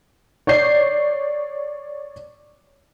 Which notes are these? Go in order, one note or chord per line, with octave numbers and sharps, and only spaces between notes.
C#5 D5 G6 C7